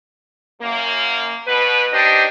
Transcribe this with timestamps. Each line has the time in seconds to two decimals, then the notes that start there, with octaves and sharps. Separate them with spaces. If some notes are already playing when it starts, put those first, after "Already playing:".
0.61 F#2 A#3
1.47 B2 B4
1.93 D4 D#4 G4 C5 D#5